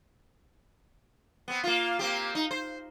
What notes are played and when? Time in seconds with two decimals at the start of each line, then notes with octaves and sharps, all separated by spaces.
1.48 B3 C4
1.63 A#3 F4
1.99 A#3 C4 G4
2.35 D#4
2.51 C5